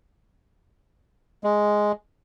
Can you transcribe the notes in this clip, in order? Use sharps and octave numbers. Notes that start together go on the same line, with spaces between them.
G#3